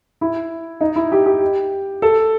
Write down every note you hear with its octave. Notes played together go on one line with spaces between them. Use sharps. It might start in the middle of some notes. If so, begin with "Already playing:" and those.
E4
D#4
E4
G4
G4
A4